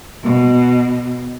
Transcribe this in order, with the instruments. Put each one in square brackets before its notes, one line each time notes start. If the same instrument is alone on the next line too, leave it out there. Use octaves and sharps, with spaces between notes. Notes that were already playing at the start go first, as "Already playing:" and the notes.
[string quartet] B2